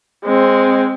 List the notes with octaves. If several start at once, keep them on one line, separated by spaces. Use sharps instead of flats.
G#3 C4